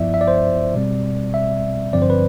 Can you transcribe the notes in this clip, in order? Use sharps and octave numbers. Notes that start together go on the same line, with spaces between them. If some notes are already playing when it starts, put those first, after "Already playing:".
Already playing: G2 F3 B3 E4 D5 E5
E5
D5
C5
D5
B2 G3 C4
E5
G2 D3 F3 C4 D5
C5
B4